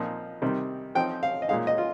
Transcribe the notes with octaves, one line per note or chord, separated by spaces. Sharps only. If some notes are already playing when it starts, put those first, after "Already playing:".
Already playing: A#2 F3 C4 D#4
C3 D#3 G3 C4 D#4
F3 C4 D#4 G5
F5
D#5
A#2 G#3 D#4 F5
D#5
F4